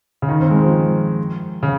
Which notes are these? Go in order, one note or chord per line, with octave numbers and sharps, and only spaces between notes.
C#3
D#3
C4
G#3
F3
C#3